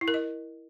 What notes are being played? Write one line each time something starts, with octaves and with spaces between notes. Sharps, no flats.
E4
A#4
D#5